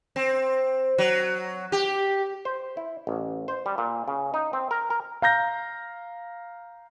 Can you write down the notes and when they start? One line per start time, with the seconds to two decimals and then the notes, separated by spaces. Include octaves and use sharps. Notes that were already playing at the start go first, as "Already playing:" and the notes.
0.16 C4
0.98 F#3
1.72 G4
2.45 C5
2.77 E4
3.07 A1
3.48 C5
3.66 G3
3.78 A#2
4.08 C#3
4.34 D#4
4.53 C4
4.71 A#4
4.90 A#4
5.22 F5 A#5 G6 A#6